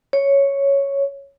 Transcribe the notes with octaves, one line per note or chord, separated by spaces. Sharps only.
C#5